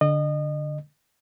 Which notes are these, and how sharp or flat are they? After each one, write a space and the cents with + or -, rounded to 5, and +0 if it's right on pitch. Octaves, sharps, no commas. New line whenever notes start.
D3 -5 D#5 -30